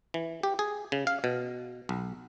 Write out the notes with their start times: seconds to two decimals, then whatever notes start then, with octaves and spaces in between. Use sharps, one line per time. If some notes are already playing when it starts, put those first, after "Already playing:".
0.14 E3
0.43 G4
0.59 G#4
0.92 C#3
1.07 F5
1.24 B2
1.89 B1